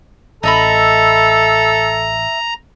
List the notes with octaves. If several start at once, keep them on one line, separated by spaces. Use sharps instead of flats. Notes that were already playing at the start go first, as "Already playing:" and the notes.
A1 A4 D#5 E5 A#5 B5